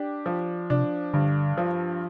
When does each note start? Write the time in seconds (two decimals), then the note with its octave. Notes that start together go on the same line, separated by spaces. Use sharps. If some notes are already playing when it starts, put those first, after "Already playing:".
Already playing: D4 G4
0.26 F3
0.70 C3 D4
1.13 G2 D3
1.58 F3